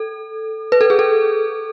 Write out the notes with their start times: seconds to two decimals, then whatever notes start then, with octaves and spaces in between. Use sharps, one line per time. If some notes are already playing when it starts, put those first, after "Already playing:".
Already playing: A4
0.72 B4
0.81 A4
0.90 G#4
0.99 A4